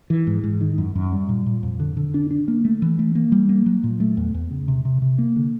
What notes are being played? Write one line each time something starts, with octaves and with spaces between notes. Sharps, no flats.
E3
G#2
G#2
D#3
F#2
F#2
G3
A#2
A#2
F2
D3
D3
D4
D4
A#3
A3
E3
A3
A#3
G3
A#3
F#3
A#2
A3
E2
E2
C#3
C3
C3
C3
A#3
D3